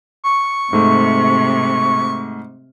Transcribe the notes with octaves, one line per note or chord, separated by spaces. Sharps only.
C#6
G#2 C3 A3